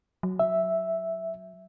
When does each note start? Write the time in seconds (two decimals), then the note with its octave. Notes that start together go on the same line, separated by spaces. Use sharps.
0.23 F#3
0.39 E5